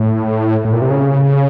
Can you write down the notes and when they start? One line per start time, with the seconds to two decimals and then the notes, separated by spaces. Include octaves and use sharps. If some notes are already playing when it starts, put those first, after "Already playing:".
Already playing: A2
0.65 A2
0.73 A#2
0.82 C3
0.90 C#3